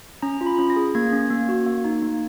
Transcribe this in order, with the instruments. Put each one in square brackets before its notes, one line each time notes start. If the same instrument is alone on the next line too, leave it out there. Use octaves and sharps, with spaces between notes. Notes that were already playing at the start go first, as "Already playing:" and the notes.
[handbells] C#4 A#5
F4
B5
C#4
A#6
G#4
A#3 G#6
C#4
A#3
F#4
A#3
D#4
A#3